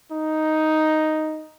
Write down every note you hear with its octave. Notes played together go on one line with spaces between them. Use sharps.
D#4